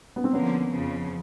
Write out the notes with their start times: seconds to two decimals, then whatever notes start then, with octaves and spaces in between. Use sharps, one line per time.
0.16 B3
0.24 C4
0.33 D3 F3 A#3 B3 C#4
0.71 F2 C#3 F3